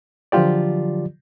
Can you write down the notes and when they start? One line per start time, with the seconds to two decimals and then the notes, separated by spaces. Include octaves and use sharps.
0.32 D3 F3 F#3 F4 G4 D5